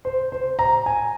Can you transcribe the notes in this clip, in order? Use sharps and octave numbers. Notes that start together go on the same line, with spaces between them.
C5
C5
A#5
G#5